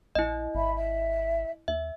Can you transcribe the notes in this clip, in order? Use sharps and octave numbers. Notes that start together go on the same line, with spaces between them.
A#1 E4 D#5
G#1 E5 B5
E5
D#2 E5